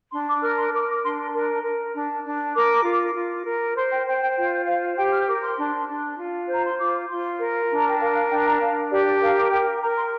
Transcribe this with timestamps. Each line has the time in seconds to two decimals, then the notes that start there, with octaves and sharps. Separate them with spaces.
0.12 D4 C6
0.28 D6
0.43 A#4 F6
0.58 C6
0.73 A#4 D6
0.88 D6
1.03 D4 C6
1.34 A#4
1.64 A#4
1.95 D4
2.25 D4
2.55 A#4 D6
2.85 F4
3.16 F4
3.46 A#4
3.76 C5 C6
3.91 G5
4.06 C5 G5
4.21 G5
4.36 F4 G5
4.66 C5 F5
4.97 G4 G5
5.13 F6
5.27 A#4 D6
5.43 C6
5.58 D4
5.88 D4
6.18 F4
6.49 C5 A#5
6.65 C6
6.78 F4 D6
7.09 F4 C6
7.39 A#4
7.70 D4
7.77 A#5
7.89 G5
7.99 A#4 F5
8.14 F5
8.30 D4 G5
8.45 A#5
8.60 D4 F5
8.90 G4 D5
9.20 A#4 F5
9.51 A#4 G5
9.81 A#4 A#5
9.97 C6